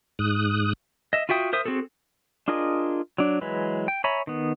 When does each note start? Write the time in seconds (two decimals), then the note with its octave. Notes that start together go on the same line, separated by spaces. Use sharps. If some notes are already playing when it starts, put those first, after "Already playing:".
0.19 G#2 D#6 F#6
1.13 D#5 E5
1.29 F4 F#4 E5 G5 D#6
1.53 A#4 C5 E5 D#6
1.66 C4 F#4 G#4 A4
2.48 D4 F4 G#4 A#4 D#5
3.18 F#3 D4
3.41 E3 F#3 G#3 B4
3.88 G5
4.04 C#5 E5 G#5 A#5 B5
4.27 D#3 B3